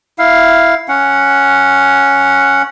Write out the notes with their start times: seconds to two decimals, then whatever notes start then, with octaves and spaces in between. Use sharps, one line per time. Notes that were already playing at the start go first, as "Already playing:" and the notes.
0.19 E4 F5
0.88 C#4 F#5